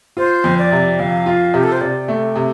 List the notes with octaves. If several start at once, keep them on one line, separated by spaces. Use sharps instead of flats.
F4 C5
F2
D5
C3
F2 F5
F4
C3 G4
A4
C5
C3 D5
A3
C3